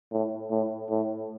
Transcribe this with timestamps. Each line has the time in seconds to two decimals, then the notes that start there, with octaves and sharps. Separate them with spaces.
0.12 A2
0.51 A2
0.90 A2